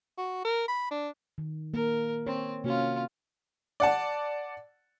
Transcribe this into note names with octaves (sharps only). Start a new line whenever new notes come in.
F#4
A#4
B5
D4
D#3
A#3 A#4
C4 C#5
C3 A#3 C#4 F4 F#4
D5 F#5 A5